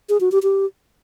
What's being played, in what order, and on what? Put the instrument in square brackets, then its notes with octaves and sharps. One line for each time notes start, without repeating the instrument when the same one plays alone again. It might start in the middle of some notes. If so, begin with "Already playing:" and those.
[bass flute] G#4
F#4
G4
G4